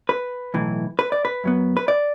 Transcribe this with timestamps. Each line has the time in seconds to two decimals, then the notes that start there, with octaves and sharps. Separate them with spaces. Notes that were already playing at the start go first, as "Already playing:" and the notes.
0.09 B4
0.54 B1 A2 E3
0.99 B4
1.12 D5
1.25 B4
1.44 F#2 F#3 B3
1.77 B4
1.88 D5